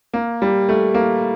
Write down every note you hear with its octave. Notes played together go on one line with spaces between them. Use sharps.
A#3
G3
A3
A#3